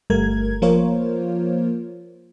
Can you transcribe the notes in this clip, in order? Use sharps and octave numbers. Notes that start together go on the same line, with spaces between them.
G1 G3 A3 A#4 G#6
F3 A#3 F4 A#4 C5 C#5